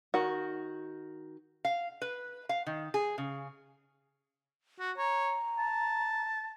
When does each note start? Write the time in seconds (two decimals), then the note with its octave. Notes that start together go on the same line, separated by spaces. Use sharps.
0.14 D#3 F#4
1.65 F5
2.02 B4
2.49 F5
2.66 D#3
2.94 G#4
3.18 C#3
4.80 F#4
4.98 C#5 A#5
5.58 A5